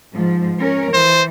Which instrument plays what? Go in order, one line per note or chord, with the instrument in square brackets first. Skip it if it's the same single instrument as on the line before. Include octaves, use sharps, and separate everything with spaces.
[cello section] G#2 F3
C#4 A#4
[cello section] E3 [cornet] C5